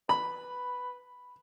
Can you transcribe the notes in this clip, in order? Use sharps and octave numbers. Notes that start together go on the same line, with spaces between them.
B4 B5